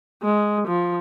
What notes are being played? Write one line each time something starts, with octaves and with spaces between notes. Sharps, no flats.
G#3
F3